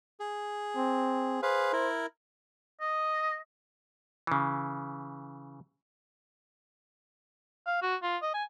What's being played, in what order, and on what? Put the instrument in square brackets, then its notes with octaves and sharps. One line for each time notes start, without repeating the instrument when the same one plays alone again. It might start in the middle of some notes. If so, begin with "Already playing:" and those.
[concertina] G#4
[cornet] C4
[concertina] G#4 B4 F5 [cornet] C5
[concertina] E4 A#4
[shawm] D#5
[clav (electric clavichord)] C#3 E3
[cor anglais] F5
F#4
F4
D#5
G#5